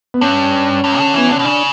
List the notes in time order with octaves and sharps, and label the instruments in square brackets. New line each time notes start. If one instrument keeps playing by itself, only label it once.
[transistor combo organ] B3
[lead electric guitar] G2 [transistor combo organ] C#4
[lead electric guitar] G2
D3
[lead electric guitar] E3 [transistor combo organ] B3
[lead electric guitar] D3 [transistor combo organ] C#4
[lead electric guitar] B2
[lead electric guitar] C#3 [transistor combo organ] D4